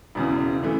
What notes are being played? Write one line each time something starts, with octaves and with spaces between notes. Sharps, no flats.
E1 E2 C#3
C#3 E3 A3